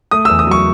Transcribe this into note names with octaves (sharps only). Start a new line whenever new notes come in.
A3 D#6
E2 E6
D#6
F#3 C#6